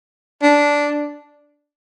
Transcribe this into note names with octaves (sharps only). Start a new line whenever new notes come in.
D4